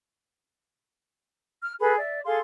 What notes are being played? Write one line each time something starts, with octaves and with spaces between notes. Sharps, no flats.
F6
G#4 A4 B4 B5
D5 E5
G#4 A4 F5 C6